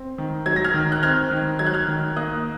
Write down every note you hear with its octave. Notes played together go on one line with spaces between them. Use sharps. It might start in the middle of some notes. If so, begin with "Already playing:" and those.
Already playing: C4
D#3
F#3 G#6
A#6
F6 G#6
D#3
F#6
C4 F6 G#6
D#3
F#3 G#6
F#6
F6 G#6
D#3
A#3 D#6 F#6